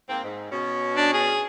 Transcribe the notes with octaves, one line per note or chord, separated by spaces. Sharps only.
G#2 A#3 C4
G#2
B2 C#4
D4
G#4